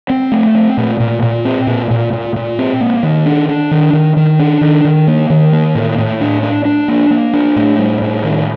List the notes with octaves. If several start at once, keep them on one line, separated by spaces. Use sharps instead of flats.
C4
A3
C4
A#2
A#2
A#2
C4
A#2
A#2
A#2
A#2
C4
A#3
D#3
D4
D4
D#3
D#3
D#3
D4
D#3
D#3
A#3
D#3
A#3
A2
A2
D4
D4
D4
A#3
A#3
D4
A2
G3
A2
D#3